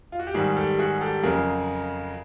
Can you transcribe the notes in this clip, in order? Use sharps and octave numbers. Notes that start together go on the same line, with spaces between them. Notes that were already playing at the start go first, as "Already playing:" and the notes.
F4
F#4
G4
G#2 D#3 G3 F#4 G#4
G4 A4
F#4 G#4
G4 A4
F2 C#3 F#3 G#4 A#4